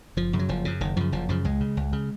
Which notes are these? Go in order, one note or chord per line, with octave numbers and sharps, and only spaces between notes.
F#1 F3
F#2 C#3
F#3
F#1 F3
F#2 C#3
F#1 D#3
F#2 C#3 F3
F#1 F3
F#2 C#3 F3
C#2 G#3
C#3
C#2
C#3